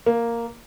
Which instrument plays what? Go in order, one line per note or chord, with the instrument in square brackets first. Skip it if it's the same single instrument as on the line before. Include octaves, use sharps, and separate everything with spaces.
[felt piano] A#3